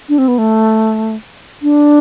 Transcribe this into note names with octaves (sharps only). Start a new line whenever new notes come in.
D4
C4
B3
A3
D4